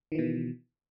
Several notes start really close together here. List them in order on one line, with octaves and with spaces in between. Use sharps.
D#3 E3 B2